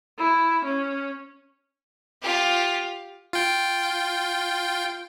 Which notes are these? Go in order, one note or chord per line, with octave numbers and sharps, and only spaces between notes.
E4
C#4
F4 G4
F4 G5